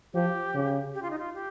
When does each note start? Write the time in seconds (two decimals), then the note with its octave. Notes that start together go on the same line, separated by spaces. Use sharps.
0.14 F3 G4
0.54 C#3
0.94 G4
1.02 F4
1.11 D#4
1.19 F4
1.35 G4